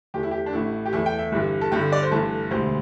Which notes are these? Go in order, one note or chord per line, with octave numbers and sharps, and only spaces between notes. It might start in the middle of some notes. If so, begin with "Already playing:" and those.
E2 E3 A3 G4
E4
G4
D4
A1 A2 A3 E4
G4
E2 E3 A3 E4
G5
E5
G1 G2 E3 G3
A4
G1 G2 D3 G4
D5
C5
G1 G2 E3 A3 A4
E1 D2 D3 G3 C5